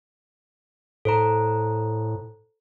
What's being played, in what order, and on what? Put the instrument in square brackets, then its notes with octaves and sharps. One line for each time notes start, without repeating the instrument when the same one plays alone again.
[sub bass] A2 [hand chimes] A4 C5 A#5